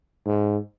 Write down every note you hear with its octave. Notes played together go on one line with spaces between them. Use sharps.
G#2